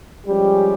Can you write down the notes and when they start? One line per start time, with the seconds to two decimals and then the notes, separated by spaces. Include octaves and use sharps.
0.25 F3 G3 G#3 C#4 G4